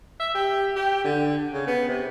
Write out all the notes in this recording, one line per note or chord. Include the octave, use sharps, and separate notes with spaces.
E5
G4
G4
D3
C#3
B3
C3